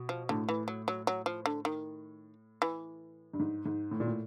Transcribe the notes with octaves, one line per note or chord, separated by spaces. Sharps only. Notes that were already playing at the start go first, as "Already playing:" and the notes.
Already playing: B2
F3
A2 D3
E3
F#3
F#3
F#3
F3
D3
D#3
E3
G2
G#2
G#2
A2
A#2
A2